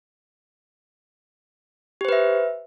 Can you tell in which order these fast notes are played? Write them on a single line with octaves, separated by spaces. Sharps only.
G4 C5 B4 E5